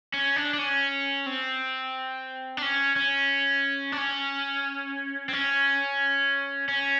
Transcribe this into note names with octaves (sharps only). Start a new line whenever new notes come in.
C#4
D4
D4
C#4
C4
D4
C#4
C#4
D4
C#4
C4
C#4
C#4